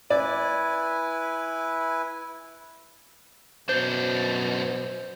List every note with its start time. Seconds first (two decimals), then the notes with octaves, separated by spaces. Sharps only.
0.10 E4 B4 D5 G#5
3.69 F#2 B2 D4 C5 G6